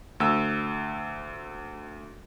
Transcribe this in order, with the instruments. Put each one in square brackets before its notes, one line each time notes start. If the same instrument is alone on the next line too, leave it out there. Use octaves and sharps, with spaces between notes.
[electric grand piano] D2 E6